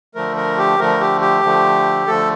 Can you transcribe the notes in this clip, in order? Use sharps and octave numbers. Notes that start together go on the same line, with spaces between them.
D3 F3 A3 A#4
A#4
G4
D3 F3 A3 A#4
G4
G4
D3 F3 A3
D3 F3 A3 A4